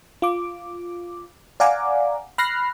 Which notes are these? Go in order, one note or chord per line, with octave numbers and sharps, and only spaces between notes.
F4 D6
D5 F5 F#5 G#5 A#5 D6
B5 F6 F#6 A#6 C7